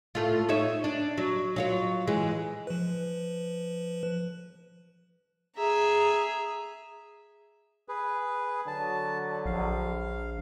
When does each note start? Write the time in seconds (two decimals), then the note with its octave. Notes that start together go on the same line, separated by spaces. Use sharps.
0.15 A2 A3 F4
0.49 D#4 C#5 E5
0.84 D4
1.18 F#3
1.56 F#3 F4 C#5
2.07 E3 G#3
2.67 F3 B4
5.57 G#4 E5 A#5
7.88 G#4 B4
8.67 D3 F#3 A5
9.46 A#1 F5